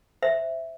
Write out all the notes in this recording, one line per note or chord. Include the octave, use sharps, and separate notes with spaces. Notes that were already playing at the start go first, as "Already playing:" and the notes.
C5 E5